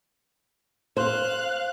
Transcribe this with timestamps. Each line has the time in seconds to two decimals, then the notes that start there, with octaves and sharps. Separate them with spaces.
0.97 C5 F5 F#6